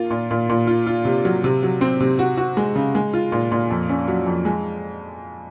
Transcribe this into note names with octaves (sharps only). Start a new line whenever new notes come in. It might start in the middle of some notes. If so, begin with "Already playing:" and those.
Already playing: A#3 F4
A#2
A#2
A#2
F4
F4
C3
F#3
C3
F#3
C4
C3
F#4
F#4
G#3
C#3
G#3
F4
A#2
A#2
F2
C#4
F#3
F2
G#3